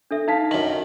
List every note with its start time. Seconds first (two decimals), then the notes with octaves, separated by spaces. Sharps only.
0.11 D4 A4 E5
0.28 D#4 F5 A5 B6
0.51 F#2 D#3 F#7